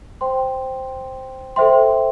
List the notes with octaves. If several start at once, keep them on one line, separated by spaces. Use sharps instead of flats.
C5 G5 C6
A4 C5 E5 G5 C6